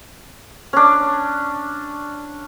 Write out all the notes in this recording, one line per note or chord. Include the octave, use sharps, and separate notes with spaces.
C#4 D4